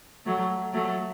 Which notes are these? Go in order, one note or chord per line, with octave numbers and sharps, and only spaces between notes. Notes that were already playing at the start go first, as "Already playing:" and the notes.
F#3 A3
F#3 A3